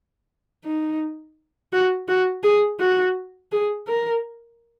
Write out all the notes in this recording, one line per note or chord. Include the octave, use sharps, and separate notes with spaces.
D#4
F#4
F#4
G#4
F#4
G#4
A#4